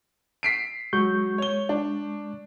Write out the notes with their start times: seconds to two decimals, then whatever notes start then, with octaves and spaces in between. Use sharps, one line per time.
0.43 B6 C7 D7
0.93 F#3 G#3 C#6 G6
1.38 C#5 G7
1.69 D4